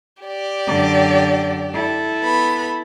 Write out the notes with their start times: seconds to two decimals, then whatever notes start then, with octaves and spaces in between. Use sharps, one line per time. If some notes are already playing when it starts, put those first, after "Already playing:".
0.23 G4 D5
0.67 F#2 D3
1.74 E4 A4
2.22 B3 B5